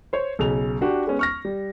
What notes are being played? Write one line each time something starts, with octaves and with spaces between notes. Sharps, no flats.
C5 C#5
B1 C#3 F7
D4 F#4 G4
G#3 B3 C#4
C#6 F6 A#6
G3